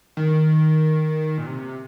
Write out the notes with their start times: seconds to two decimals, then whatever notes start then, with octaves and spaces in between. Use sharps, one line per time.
0.17 D#3
1.38 A#2
1.47 C3